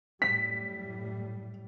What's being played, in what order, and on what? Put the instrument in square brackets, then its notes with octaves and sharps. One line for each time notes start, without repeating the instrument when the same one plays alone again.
[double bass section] F#2 A2 G3 [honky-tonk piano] B6